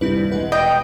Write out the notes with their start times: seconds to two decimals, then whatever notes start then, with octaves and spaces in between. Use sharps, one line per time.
0.01 D#1 C2 G2 C4 E4 B4
0.32 E1 B2 G#3 B4 F#5
0.52 D#5 G5